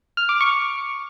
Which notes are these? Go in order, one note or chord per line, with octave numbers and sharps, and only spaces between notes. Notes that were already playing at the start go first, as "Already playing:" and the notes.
F6
D6
C#6